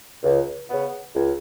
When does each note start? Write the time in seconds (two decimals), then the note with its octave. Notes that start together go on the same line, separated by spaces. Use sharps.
0.23 C#2
0.69 C#3 B3
1.15 C#2